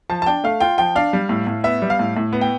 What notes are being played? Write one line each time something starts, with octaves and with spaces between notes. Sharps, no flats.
F3 A5
A5
D4 G5
A3 F5
F4 G5
F3 G5
D4 F5
G3
A2
A2
B3 E5
G3
F5
A2
A2
B3
G5